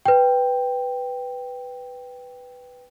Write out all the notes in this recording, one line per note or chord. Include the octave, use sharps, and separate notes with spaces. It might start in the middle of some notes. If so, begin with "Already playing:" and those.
B4 G5